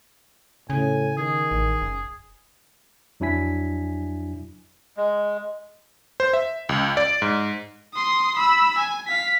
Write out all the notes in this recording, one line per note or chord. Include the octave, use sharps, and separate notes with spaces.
A2 C#3 G#5
D#3 G#4
A1
F#1
F2 F#3 D4 E4 G#5 B6
G#3
C5
E5
C#2
D5
G#2
C6 D#6
B5 E6
G#5
F5 B6